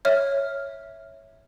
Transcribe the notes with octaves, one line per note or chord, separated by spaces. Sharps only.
C#5 E5 F6